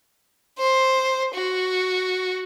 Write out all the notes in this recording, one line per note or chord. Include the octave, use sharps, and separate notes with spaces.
C5
F#4